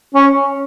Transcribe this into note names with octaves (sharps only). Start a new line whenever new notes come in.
C#4